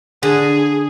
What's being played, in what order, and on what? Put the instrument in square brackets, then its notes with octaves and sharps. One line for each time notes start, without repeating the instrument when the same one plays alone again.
[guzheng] D3 [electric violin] G#4